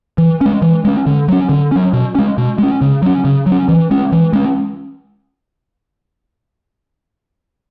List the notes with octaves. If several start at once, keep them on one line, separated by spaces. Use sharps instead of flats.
E3
G#3 C#4
E3
G#3 C#4
D3
F#3 C#4
D3
F#3 C#4
B2
G#3 C#4
B2
G#3 C#4
C#3
F#3 C#4
C#3
F#3 C#4
E3
G#3 C#4
E3
G#3 C#4